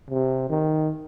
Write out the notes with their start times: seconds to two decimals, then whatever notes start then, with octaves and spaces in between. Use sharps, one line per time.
0.10 C3
0.50 D#3